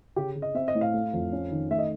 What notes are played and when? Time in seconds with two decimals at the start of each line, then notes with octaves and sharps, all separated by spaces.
0.16 C#3 G4
0.35 C#3
0.42 D#5
0.54 C4 E5
0.68 D#5
0.75 A2
0.81 F5
0.94 A3
1.13 F2
1.32 C#4
1.51 D#3
1.70 A3 E5
1.79 D#5